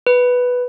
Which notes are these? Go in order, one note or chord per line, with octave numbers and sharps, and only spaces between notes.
B4